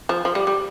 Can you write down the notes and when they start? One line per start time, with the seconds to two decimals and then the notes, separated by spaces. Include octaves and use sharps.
0.09 F3
0.25 F3
0.35 G3
0.47 G3